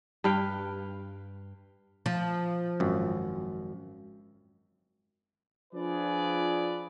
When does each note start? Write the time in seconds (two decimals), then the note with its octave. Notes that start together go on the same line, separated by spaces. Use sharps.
0.24 G2 B4 F5 G5
2.06 F3
2.80 G#1 F#2
5.74 F3 D4 F4 G#4 B4 D5